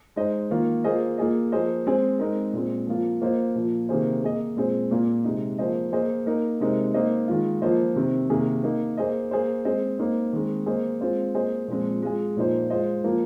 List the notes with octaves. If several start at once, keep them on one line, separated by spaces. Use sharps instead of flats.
G#3 D#4 C5 D#5
D#3 A#3 F4
A#3 F4 G#4 C5 D#5
A#3 F4 G#4 D#5
F3 A#3 G#4 C5 D#5
G#3 C4 G#4 C5
G#3 C4 D#4 A#4
A#2 G#3 C4
F3 A#3 F4
A#3 F4 C5 D#5
A#2 F3 A#3 F4
C3 D#3 A#3 G#4 C5
A#3 G#4 D#5
A#2 G#3 C4 G#4 C5
A#2 A#3 F4
C3 G#3 D#4
F3 A#3 G#4 C5 D#5
A#3 G#4 C5 D#5
A#3 D#4 A#4
C3 G#3 C4 D#4 A#4
A#3 D#4 C5 D#5
D#3 G#3 F4
F3 A#3 F4 C5 D#5
C3 D#3 C4
C3 D#3 A#3 G#4
A#3 D#4 A#4
A#3 G#4 C5 D#5
A#3 G#4 C5
G#3 C4 G#4 C5 D#5
A#3 D#4 C5
D#3 G#3 C4
A#3 G#4 C5 D#5
G#3 C4 F4 C5
A#3 G#4 C5 D#5
A#2 F3 G#3 C4
G#3 F4 G#4
A#2 F3 A#3 D#4 C5
G#3 F4 C5 D#5
F3 A#3 F4 A#4